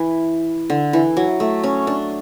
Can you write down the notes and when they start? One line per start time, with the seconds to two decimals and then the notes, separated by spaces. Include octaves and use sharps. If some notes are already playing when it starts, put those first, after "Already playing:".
Already playing: E3
0.70 D3
0.93 E3
1.17 F#3
1.40 A3
1.63 C#4
1.87 D4